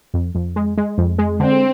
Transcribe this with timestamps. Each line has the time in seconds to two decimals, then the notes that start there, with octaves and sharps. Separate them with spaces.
0.14 F2
0.35 F2
0.56 G#3
0.77 G#3
0.98 F2
1.18 G#3
1.40 D3 C4